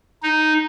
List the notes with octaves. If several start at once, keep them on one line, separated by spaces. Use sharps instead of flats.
D#4